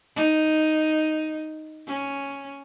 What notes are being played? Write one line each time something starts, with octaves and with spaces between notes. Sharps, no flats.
D#4
C#4